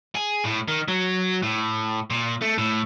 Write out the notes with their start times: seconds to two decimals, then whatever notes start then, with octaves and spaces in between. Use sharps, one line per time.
0.15 G#4
0.45 A2
0.68 D#3
0.88 F#3
1.42 A2
2.10 A#2
2.42 A3
2.58 A2